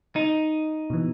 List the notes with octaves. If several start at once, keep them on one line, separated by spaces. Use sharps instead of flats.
D#4
B2 E3